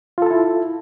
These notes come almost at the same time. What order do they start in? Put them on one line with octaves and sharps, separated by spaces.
F4 A4 A5 E4